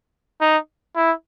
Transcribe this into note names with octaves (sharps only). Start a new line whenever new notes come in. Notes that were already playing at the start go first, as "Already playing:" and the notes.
D#4
E4